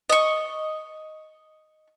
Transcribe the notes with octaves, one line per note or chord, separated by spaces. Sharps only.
D#5 C#6